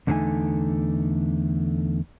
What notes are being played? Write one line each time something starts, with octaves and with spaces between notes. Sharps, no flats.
E2 D3 A3 D4 D#4 G#5